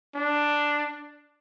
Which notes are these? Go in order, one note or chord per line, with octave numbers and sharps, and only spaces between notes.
D4